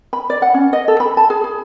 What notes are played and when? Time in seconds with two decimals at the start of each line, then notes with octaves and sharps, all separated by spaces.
0.13 B5
0.30 D5
0.42 F#5
0.54 C#4
0.73 D#5
0.88 A4
1.00 B5
1.17 A5
1.30 G#4
1.44 G#4